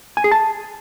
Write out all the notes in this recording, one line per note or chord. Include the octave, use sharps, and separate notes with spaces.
G#5
G#4
A5